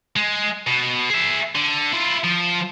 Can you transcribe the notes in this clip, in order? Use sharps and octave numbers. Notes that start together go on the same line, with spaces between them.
G#3
B2
G#4 E5
D3
E4 F4
F3